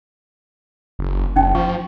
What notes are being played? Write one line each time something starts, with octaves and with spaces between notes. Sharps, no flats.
F#1
F#1 C#4 D#4 G5
F3 C#6